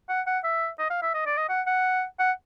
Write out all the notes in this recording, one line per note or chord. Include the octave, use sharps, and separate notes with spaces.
F#5
F#5
E5
D#5
F5
E5
D#5
D5
D#5
F#5
F#5
F#5